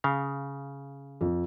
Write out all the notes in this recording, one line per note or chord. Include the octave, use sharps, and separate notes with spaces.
C#3 F5
F2